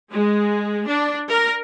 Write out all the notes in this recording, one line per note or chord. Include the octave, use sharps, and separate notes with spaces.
G#3
D4
A#4